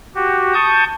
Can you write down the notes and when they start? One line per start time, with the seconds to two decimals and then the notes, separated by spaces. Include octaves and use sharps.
0.15 F#4 G4
0.54 A5 C#6 D#6 G6